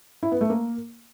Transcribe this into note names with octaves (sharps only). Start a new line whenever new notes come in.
E4
B3
A3
A#3